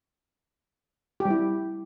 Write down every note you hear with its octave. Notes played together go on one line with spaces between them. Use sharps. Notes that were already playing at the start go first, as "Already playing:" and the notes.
G4
G3
E4